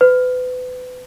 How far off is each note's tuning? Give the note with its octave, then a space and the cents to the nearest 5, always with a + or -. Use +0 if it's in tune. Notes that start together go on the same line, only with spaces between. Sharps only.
B4 +30